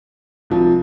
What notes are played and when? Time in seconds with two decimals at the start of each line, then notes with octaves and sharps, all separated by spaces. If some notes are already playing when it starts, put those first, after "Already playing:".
0.50 C2 C3 F3